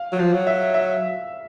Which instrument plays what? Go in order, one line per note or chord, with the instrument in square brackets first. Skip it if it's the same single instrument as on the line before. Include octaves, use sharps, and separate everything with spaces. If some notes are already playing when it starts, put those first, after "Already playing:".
Already playing: [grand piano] F5
[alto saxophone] F#3
[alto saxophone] F3 [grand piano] F5
[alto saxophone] F#3
[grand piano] E5
E5